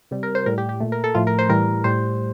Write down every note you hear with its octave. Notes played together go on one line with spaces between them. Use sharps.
C3 G3
A#4
C5
A2 G3 A#4
G4
G4
A#2 A3
A#4
A4
A2 F3 A3 F4
A#4
C5
A2 E3 G3 A#4
A2 G3 C5